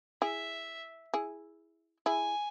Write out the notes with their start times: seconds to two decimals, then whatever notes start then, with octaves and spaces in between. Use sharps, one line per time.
0.22 E4 G#4 E5
1.14 E4 G#4
2.06 E4 G#4 G#5